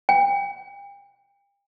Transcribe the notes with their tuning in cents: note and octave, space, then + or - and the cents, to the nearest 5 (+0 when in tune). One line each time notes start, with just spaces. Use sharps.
G5 +35